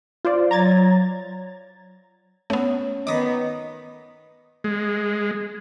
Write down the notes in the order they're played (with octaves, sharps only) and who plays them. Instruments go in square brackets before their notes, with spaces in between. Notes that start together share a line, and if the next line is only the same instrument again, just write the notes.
[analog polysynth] F4 C5 D5
[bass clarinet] F#3 [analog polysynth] A#5 G#6 A6
[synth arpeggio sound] A3 B3 [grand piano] C#4
[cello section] D#3 B3 [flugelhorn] D#5 [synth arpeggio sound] D6 D#6 A#6
[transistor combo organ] G#3